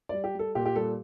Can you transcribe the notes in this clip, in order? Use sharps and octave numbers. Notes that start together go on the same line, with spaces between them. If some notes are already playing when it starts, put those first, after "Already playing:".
G3 D5
G4
G3 A4
A#2 G4
G4
G3 A4